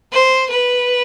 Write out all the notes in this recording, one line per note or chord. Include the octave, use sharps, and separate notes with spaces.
C5
B4